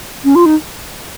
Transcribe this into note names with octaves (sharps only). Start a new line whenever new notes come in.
C#4
F4
D#4